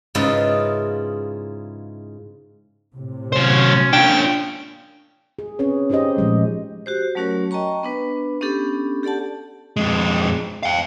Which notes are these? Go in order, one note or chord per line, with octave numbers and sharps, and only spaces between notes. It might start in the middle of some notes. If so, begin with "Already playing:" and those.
G#2 C#3 E4 F4 B4 D#5
A2 C3
F#3 C#4 C5
D4 F4 G5
G#4
C4 C#4 G#4 B4 C#5
C#4 D#4 G4 C5 D#5
A#2 F3 G#3 A3
F#4 G4 C5
F#3 A3 C#4 F#4 A#4 C#5
D#5 G5 A5 A#5 C#6
B3 D4 B4
B3 C#4 D4 G4 A4
G4 A4 D5 F#5 A5
F2 G#3
F5 G5